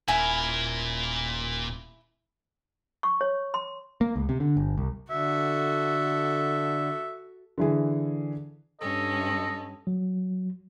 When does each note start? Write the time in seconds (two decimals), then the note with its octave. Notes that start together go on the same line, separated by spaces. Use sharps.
0.08 D#1 A#2 E4 A#4 G#5
3.03 C#6
3.21 C#5
3.54 C6
4.01 A#3
4.16 C#2
4.29 C3
4.40 D3
4.57 G1
4.78 C2
5.11 D3 F#4 A4 E5
7.58 D3 E3 G#4
8.81 G2 C#4 A4 D#5
9.87 F#3